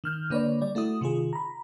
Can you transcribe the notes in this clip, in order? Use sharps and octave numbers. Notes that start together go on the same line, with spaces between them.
D#3 F6 G6
D3 A#3 B4 C#5 D5
G3 D5
A3 E4 F#4 D#6
C3 D#3 F4 G#4
A#5 B5